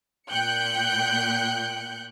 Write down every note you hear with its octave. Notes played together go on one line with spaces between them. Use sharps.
A#2 G5 F#6 G6 C#7